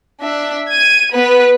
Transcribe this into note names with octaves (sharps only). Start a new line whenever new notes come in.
D4 E5
G#6 D#7
B3 B4